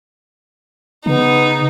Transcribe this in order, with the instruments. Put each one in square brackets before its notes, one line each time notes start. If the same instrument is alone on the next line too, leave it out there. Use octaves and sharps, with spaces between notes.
[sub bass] C#3 [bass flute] B3 [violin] D#4